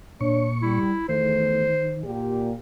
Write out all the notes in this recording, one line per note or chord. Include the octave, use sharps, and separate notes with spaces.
A#2 D4 C#5 C#6
G3 E4
E2 D#3 A3 C5
A#2 G4